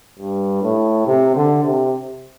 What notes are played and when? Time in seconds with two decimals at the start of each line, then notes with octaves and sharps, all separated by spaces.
0.19 G2
0.62 A2
1.06 C3
1.36 D3
1.64 C3